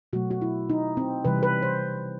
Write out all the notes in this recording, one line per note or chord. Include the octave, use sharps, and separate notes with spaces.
B2 F#3 A3 F#4
F#4
E4
D#4
C4
C3 E3 G3 B4
B4
C5